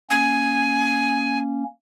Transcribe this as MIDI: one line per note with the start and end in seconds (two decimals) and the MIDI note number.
0.10 1.64 58
0.10 1.64 61
0.10 1.38 80